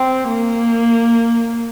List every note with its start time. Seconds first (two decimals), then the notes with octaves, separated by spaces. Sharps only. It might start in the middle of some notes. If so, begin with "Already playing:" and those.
Already playing: C4
0.29 A#3